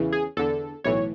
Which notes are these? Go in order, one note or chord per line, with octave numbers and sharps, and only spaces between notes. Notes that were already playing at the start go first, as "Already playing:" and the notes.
Already playing: E2 C#3 E3
G#4
E2 D3 A4
B1 A2 E3 C#5